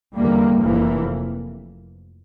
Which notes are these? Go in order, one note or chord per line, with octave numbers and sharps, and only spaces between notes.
E2 D3 G3 A#3
F1 F2 E3 A#3